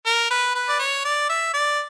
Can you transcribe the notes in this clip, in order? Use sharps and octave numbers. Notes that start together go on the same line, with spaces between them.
A#4
B4
B4
D5
C#5
D5
E5
D5